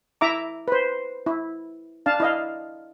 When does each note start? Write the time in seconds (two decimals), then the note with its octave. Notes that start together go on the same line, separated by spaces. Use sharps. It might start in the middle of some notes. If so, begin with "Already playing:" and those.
0.21 E4 E5 A#5 D6
0.68 B4 C5
1.26 E4
2.06 D4 F5 A5
2.20 E4 D#5 F5